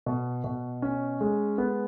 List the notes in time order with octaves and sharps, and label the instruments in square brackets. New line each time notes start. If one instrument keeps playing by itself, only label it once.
[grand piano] B2
B2
C#4
G#3
B3